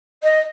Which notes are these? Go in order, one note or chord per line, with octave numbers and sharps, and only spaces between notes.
D#5